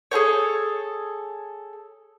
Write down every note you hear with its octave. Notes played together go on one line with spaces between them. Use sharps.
G#4 A4 C5 C#5